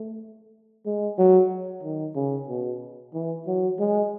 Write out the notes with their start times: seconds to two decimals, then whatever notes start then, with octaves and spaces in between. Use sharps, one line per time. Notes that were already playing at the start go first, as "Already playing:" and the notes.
Already playing: A3
0.86 G#3
1.18 F#3
1.83 D#3
2.16 C#3
2.49 B2
3.14 E3
3.47 F#3
3.79 G#3